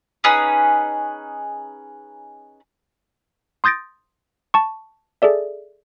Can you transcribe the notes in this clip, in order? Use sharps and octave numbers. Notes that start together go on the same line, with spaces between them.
C#4 D#4 G#4 B4
C6 D#6 G6 A6 A#6 D7
A5 C#6
G#4 A4 D5 E5